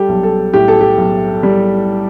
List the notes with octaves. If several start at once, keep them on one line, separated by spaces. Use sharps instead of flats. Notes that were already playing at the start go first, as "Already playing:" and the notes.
Already playing: G3 G4 A4
B1
A4
A2 G4
A4
G4
B1
G3